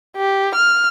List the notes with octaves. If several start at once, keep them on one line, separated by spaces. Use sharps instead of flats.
G4
F6